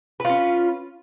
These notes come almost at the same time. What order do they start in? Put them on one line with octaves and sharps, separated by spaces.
B4 F4 C#4